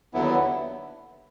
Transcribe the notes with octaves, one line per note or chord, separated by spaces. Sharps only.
D#2 D3 F#3 B3 E4